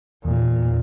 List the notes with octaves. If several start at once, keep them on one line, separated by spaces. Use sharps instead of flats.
E2 A#2